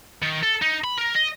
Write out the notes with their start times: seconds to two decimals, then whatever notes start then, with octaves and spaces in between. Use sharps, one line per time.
0.23 D#3
0.43 A4
0.62 D#4
0.84 B5
0.98 A#4
1.15 D#5